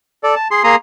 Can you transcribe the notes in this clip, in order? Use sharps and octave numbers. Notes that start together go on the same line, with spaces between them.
A4 D5
A5
G#4 C6
A#3 G#4 A#5 C6 D#6